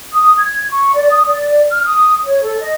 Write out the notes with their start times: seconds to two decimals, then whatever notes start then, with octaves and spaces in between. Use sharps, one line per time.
0.13 D#6
0.38 G#6
0.70 C#6
0.95 D5
1.11 D#6
1.27 D5
1.72 F6
1.86 D#6
2.25 C#5
2.42 A4
2.61 D#5